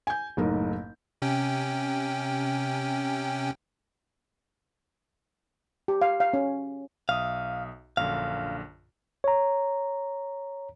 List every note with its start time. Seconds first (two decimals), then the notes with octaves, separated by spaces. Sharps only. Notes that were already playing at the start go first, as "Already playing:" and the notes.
0.07 G#5 G6
0.37 F#1 B1 A2 D#4 A#4
1.22 C3 C#4 G5
5.88 G4
6.02 F5
6.20 F5
6.34 C#4
7.09 B1 E5 F5 D#6
7.97 A#1 F#2 D3 F5
9.24 C#5 A#5